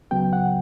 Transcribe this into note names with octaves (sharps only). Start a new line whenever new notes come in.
C#2 C#3 F#3 B3 G5
F#5